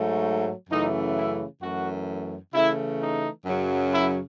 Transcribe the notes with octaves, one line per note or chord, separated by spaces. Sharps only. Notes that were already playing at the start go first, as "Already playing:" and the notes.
Already playing: G#2 F#3 A3
F#2 C#3 E3 A3 D#4
E4
F#2 E3 A3 F#4
C#3 E3 A3 E4
D#4
F#2 C#3 F#3
E4